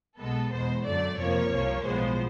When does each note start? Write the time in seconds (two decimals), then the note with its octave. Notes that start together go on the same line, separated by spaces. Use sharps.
0.18 B1 B2 G#3 B3 A4
0.51 E2 B2 G#3 B3 C5
0.85 F#2 D3 F#3 A3 D5
1.18 F2 C3 F3 A#3 C#5
1.51 C2 C3 F3 A#3
1.84 B1 A2 F3 G#3 B3 C5